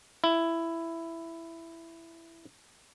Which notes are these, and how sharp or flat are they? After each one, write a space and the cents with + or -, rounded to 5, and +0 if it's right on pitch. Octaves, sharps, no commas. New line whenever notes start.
E4 +10